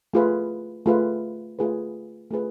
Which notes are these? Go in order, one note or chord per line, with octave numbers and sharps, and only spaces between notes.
A3 F4 G#4 B4
A3 F4 G#4 B4
A3 F4 G#4 B4
A3 F4 G#4 B4